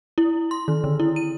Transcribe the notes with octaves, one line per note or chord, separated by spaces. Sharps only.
E4
C6
D#3
D3
E4
D#7